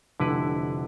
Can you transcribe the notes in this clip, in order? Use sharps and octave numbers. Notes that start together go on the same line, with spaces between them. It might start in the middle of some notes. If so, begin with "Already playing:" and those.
F1 D3 E4 G4 B4